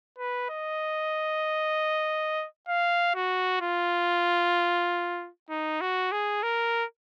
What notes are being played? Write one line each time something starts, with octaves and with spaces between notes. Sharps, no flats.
B4
D#5
F5
F#4
F4
D#4
F#4
G#4
A#4